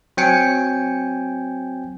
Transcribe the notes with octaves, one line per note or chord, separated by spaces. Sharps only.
F#3 C4 G5 G#5 C#7